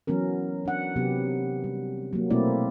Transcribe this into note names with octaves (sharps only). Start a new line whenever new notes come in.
E3 F#3 B3 C#4 A#4
D4 F#5
C3 F#3 B3 G4
G3
F#3 A#3
B2 A3 A#3 C4 E4 D5